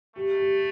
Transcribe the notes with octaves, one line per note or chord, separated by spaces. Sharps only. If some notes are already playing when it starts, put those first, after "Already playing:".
A3 G4
G4